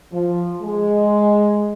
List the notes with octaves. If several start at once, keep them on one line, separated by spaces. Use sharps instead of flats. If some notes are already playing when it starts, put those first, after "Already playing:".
F3
G#3